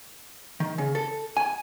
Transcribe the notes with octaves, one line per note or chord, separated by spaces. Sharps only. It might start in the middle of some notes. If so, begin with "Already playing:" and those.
D#3
C#3
A4
G#5